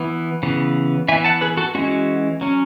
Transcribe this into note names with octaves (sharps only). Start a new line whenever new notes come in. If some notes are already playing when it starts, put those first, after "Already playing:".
Already playing: E3 B3
C#3 E3 B3
E3 B3 E5 G#5
F#5 A5
G#4 B4
F#4 A4
E3 G#3 C#4 F#4
F#3 C#4